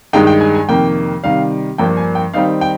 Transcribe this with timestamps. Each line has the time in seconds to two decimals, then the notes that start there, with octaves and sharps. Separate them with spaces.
0.13 G2 D#3 G#3 D#4 G5
0.27 G5
0.41 G#5
0.55 G#5
0.68 F2 C3 D#3 A#3 G5
1.24 C3 D#3 G3 F5
1.78 G2 F3 A#3 D4 G5
1.97 G#5
2.15 G5
2.34 D#3 G3 C4 D#4 F5
2.61 G5